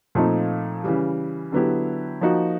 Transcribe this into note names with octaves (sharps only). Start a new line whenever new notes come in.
A#2 F3 A3 C4 D#4
C#3 E3 G3
D3 F#3 B3 E4 G4
F3 A#3 D#4 F#4